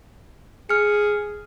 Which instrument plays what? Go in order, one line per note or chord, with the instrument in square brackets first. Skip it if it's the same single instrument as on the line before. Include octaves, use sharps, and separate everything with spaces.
[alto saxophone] G#4 [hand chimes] F6 C#7